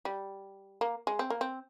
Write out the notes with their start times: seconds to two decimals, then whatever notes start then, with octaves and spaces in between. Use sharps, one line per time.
0.05 G3
0.81 A#3
1.07 G#3
1.19 C4
1.30 A#3
1.41 C4